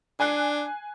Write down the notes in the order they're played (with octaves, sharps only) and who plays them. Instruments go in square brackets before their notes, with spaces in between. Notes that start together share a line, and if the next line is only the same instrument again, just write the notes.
[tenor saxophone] D4 [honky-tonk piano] G#5 F#6 C7